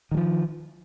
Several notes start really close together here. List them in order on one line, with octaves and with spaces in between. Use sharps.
D#3 G3 F3